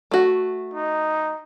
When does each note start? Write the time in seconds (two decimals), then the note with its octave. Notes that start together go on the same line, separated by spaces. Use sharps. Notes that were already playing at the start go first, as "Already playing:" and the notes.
0.11 A3 F#4
0.74 D#4